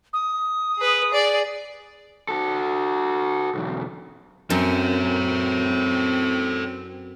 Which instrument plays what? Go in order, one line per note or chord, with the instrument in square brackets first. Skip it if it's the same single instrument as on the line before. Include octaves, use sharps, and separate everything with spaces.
[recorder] D#6
[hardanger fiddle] G#4 B4
G#4 D5
[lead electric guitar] F#4 A4
B1 E2
[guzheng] F#2 [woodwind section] C4 [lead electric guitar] A4 C#5